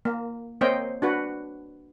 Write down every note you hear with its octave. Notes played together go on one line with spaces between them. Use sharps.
A#3
A#3 C4 C5 C#5 D#5 G5
D4 F#4 B4